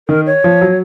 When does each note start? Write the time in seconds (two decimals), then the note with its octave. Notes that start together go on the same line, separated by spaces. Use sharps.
0.08 D#3 A#4
0.26 C#5
0.44 F3
0.61 F#3